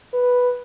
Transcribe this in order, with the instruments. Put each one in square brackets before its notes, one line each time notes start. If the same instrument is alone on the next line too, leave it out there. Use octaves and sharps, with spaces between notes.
[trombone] B4